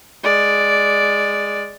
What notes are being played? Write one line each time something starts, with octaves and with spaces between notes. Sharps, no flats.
G#3 D5